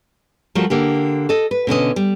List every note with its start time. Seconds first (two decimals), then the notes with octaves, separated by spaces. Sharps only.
0.55 F3 G3 A3 F#4 A#4
0.70 D3 A#3 G4
1.29 A4 D#5
1.51 B4
1.67 B2 D3 C#4 D#5
1.96 G3